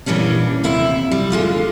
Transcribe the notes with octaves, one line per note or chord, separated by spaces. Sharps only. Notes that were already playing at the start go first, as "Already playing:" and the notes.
A#2 E3 G3 C#4 D4
D#2 C3 E4 E5
G3
D3 G#3 F4